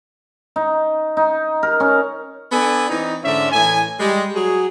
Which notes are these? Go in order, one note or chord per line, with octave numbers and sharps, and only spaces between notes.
D#4
D#4
A#4
C#4
B3 D4 A4 D5 G#5
E3 C4 D#4
G#2 D3 C#4 D5 E5
A2 E3 G#5
G3 G#3
F#3 F#4 G#4